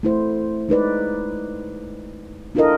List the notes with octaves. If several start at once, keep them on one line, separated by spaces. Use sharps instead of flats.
A3 E4 C5
G#3 D#4 B4 D5
D4 E4 F4 A4 A#4 D#5